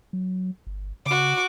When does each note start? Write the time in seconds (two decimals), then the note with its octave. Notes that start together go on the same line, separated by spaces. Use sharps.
0.13 F#3
0.67 G1
1.06 C#3 F#4 D6